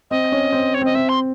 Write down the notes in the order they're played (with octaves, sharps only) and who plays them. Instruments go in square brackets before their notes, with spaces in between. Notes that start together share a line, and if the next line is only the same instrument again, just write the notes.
[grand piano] C4 [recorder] D#5
[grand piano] C#4
C4
[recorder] C#5
[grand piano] C4 [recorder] D#5
[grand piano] C4 [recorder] E5
[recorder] C6